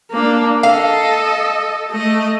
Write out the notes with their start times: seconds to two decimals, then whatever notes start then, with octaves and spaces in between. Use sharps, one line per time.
0.12 A#3 D4
0.63 A4 D#5 F5
1.91 A3 D#5